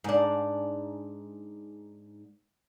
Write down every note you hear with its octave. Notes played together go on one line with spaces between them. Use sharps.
G#2 D4